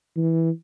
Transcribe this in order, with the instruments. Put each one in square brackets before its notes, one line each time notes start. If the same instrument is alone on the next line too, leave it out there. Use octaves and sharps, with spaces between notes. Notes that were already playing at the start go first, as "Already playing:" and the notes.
[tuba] E3